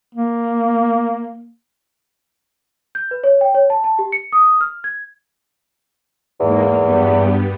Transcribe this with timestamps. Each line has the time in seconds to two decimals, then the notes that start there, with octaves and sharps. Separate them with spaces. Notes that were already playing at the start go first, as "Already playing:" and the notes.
0.15 A#3
2.95 G6
3.11 B4
3.24 C#5
3.41 G5
3.55 C#5
3.70 A5
3.84 A5
3.99 G4
4.12 C#7
4.33 D#6
4.61 F6
4.84 G#6
6.40 E2 G#2 A#3
6.84 G2 G3 B3